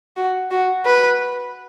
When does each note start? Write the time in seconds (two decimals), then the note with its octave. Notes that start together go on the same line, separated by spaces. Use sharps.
0.17 F#4
0.51 F#4
0.85 B4